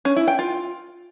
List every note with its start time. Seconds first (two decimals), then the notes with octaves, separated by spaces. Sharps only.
0.05 C#4
0.16 E4
0.28 G5
0.39 F4